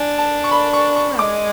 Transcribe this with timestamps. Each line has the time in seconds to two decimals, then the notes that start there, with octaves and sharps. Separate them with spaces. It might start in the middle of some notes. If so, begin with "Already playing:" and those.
Already playing: D4 G#5
0.18 A5
0.44 C#6
0.51 B5
0.73 C#6
0.96 C#6
1.19 G#3 D6